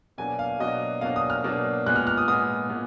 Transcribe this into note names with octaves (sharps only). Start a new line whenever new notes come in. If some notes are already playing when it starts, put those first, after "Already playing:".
B2 F#3 A#3 D4 G#5
F5
B2 F#3 A#3 D4 D#5
B2 F#3 A#3 D4 F5
D#6
F6
B2 F#3 A#3 D4
A#2 G#3 B3 F#6
F6
F6
D#6
A#2 G#3 B3 D#6
A#2 G#3 B3